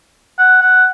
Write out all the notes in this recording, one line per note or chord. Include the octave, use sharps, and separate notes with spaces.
F#5
F#5